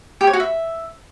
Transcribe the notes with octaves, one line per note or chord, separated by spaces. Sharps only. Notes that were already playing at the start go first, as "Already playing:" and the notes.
G4
C#5
F#4
E5